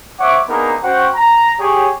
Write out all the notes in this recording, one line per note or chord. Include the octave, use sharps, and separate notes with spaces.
C5 C#5 E5 F#5 D6
A#3 B3 D4 D#4 G#4 A#4
C#4 F#4 C5 F#5 G5
A#5
G4 G#4 C#5